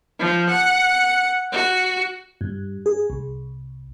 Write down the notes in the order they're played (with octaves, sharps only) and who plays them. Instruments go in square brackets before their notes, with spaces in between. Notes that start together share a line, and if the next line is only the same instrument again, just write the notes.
[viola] F3
F#5
F#4
[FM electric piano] G2
G#4
C2